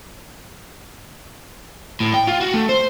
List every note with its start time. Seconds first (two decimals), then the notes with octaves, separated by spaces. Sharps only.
2.00 A2
2.14 G5
2.27 F4
2.41 F#4
2.54 A3
2.69 C5